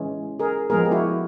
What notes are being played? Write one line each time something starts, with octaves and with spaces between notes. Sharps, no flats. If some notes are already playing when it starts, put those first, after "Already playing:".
Already playing: E3 G#3 C#4
G#4 A#4
F3 G#3 B3 G#4 A#4
G4
E4 F#4